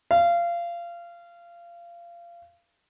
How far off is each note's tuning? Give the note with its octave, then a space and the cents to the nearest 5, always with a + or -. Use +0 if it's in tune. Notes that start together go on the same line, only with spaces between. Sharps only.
F5 -25